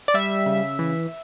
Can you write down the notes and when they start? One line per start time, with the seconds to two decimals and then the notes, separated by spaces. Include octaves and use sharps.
0.08 D5
0.14 G3 E5
0.46 C#3
0.79 E3